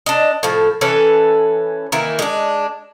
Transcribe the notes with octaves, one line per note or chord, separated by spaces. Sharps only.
D4 D#5
A2 F3
E3 C#4 A4 B4
D#3 E3 A#3 E4
G#3 D4